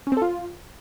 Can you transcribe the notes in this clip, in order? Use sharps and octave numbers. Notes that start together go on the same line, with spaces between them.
C#4
C4
A4
F4